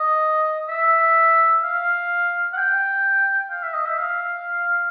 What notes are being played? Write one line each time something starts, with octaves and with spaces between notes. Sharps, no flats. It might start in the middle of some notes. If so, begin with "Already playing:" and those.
Already playing: D#5
E5
F5
F#5
G5
F5
E5
D#5
E5
F5